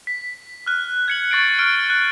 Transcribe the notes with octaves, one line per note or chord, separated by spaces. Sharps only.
B6
F6 F#6
G#6 C#7 F#7
C#6 A6 C7 D7
F6 D7 G7
F#6